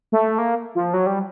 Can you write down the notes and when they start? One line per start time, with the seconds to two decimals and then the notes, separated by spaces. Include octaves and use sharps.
0.12 A3
0.38 A#3
0.75 F3
0.94 F#3
1.07 G3